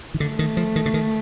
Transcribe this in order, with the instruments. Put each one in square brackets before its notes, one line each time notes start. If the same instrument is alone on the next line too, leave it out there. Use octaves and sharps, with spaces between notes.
[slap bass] D#3
[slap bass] D3 [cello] A3
[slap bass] D#3
F3
D#3
D3
D#3